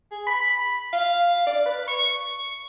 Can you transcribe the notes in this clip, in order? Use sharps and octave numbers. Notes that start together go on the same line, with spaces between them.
G#4
B5
F5
D5
B4
C#6